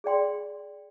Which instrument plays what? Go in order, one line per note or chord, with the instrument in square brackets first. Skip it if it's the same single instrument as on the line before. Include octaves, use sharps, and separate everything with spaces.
[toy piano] G#4 D5 G5 C6